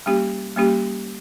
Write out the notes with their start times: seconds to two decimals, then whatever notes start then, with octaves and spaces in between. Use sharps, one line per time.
0.06 G3 A#3 C#4 G4
0.56 G3 A#3 C#4 G4